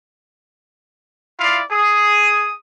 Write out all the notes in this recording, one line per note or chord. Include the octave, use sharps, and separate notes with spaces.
E4 F4 D5 F5
G#4 D#6